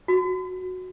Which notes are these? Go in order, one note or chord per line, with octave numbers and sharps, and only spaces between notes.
F#4